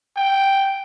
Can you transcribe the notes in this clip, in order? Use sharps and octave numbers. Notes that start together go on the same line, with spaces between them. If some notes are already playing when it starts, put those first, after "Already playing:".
G5